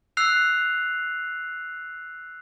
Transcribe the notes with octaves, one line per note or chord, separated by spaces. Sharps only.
E6 F#6 C7 F7